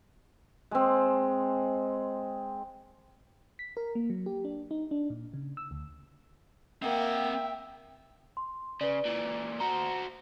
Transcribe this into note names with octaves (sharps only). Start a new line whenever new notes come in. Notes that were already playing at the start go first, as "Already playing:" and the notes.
G#3 C4
B6
A#4
A#3
F#3
G4
D4
D#4
D4
A#2
C#3
E6
D2
A#3 C4 E5 F#5 G5
C6
C#3 B4 D5
A#2 E3
F#4 C5 A#5